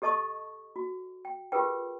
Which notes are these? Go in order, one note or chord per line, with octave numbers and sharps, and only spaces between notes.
G4 A4 D#5 A5 C#6 D#6
F#4
G5
F4 G4 G#4 A#4 B4 G5